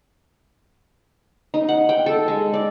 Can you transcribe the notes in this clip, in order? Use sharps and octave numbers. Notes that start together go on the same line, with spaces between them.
D#4
F#5
G5
A4
G#3
D5